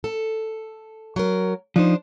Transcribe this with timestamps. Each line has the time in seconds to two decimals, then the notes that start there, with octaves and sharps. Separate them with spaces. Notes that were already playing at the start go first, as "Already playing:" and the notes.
0.04 A4
1.16 F#3 A#4
1.76 F3 D4 D#4 C5